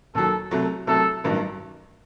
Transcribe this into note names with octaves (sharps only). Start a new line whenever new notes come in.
D#2 D#3 F#3 A4
C2 C3 F#3 A3
C2 C3 F#3 A3 A4
A1 G2 D#3 F#3